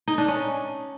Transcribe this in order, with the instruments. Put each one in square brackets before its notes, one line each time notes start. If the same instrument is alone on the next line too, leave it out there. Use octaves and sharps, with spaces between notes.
[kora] D#4
D4
C#4